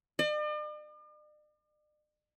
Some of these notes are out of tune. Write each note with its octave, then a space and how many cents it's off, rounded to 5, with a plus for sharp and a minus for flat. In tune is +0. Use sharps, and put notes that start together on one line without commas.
D5 +45